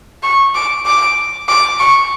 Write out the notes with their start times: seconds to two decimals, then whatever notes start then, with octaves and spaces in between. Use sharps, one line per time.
0.23 C#6
0.55 D6
0.86 D6
1.48 D6
1.80 C#6